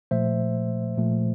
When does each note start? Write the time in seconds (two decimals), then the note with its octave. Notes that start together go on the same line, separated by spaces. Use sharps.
0.11 A#2 F3 A3 C5 E5
0.98 A#2 F3 A3